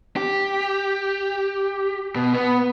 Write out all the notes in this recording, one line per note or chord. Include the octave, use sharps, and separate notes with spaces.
G4
B2
B3